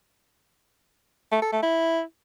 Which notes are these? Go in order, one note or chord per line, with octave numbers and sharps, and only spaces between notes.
A3
A4
A3
E4